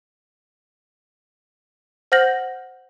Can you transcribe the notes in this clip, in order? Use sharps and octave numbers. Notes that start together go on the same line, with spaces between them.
C5 F#5 F6 G6 A#6 F#7